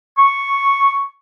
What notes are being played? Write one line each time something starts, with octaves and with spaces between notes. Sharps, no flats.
C#6